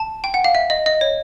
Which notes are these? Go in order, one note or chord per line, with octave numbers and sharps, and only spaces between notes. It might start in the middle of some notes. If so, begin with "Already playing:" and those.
Already playing: A5
G5
F#5
F5
E5
D#5
D#5
C#5